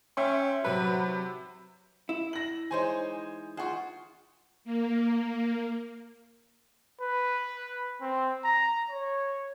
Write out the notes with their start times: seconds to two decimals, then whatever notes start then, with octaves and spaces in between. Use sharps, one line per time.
0.17 C#4 E5 G5 C6
0.65 C3 F#3 B4 B5
2.09 E4
2.33 A#6 F#7
2.71 E3 G#3 D#4 C5 C#5 G#5
3.57 F4 G#4 C5 F#5 C#6
4.65 A#3
7.01 B4
8.01 C4
8.44 A#5
8.89 C#5